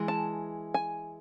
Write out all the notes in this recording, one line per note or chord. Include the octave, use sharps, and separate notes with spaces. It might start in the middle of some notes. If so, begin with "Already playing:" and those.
Already playing: E3 G#3
A5
G#5